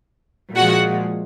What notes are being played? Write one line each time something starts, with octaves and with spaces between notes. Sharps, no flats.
A#2 F3 G#3 F#4 F#5